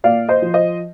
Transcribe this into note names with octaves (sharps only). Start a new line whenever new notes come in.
A#2 D5 F5
C5 D#5
F3
C5 D#5